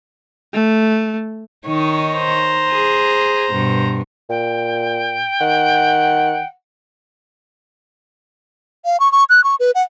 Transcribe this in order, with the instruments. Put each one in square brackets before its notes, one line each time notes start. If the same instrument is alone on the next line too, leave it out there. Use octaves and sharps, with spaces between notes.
[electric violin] A3
[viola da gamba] D#3 D#4 C#5
[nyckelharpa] C5 A#5
[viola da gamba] G#4
G2 B2
[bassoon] A#2 [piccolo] G5
[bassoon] D#3 [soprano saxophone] F#5
[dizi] F5
C#6
C#6
F#6
C#6
B4
F#5